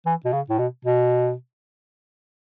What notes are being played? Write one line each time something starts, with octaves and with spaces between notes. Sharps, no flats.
E3
B2
C#3
A2
B2
B2